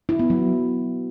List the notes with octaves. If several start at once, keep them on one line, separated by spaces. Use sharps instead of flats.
E4
B3
F#3